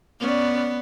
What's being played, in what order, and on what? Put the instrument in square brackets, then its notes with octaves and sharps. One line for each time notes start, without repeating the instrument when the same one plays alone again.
[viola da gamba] B3 [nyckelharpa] C#4 D5